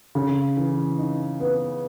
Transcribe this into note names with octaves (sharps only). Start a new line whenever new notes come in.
C#3
E3
D#4
B3